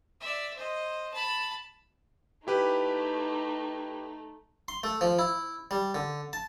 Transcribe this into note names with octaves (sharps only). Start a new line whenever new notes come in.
D5 E5
C5 D#5
A5 B5
A3 D#4 E4 G4 B4
C6
A3
F3
E4
G3
D3
A5